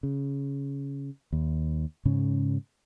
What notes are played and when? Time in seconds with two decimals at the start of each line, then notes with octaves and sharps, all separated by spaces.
0.03 C#3
1.32 D#2
2.05 G#2 C#3 C#4